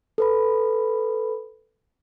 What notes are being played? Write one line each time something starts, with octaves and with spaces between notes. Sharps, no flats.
A4 B4 B5